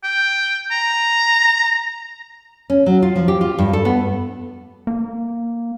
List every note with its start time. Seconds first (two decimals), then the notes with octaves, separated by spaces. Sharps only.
0.04 G5
0.71 A#5
2.70 C#4
2.86 F#3
3.02 F4
3.16 F3
3.28 G4
3.41 F4
3.59 G2
3.73 A4
3.85 B3
4.87 A#3